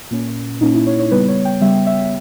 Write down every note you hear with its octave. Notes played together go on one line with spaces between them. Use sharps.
A#2 A#3 C#4
A#2 A#3 C#4 D#4
E4
C#5
C#5
C#3 G3 B3 B4
C#5
G5
C#3 G3 B3 E5
E5
E5